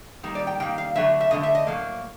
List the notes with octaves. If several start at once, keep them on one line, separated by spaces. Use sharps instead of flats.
D#3 G3 A#3
D5
G5
D#3 G3 A#3 G5
F5
D3 F#3 A3 E5
E5
D3 F#3 A3 D#5
E5
D#5
A2 F#3 A#3